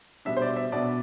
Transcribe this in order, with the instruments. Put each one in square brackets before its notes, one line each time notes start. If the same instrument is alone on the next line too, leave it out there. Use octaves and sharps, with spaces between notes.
[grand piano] B2 G3 B3 D4 E5
C5
D5
E5
B2 B3 D4 D5